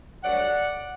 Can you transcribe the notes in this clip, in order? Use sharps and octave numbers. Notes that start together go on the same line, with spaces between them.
G2 F#3 A3 D5 F#5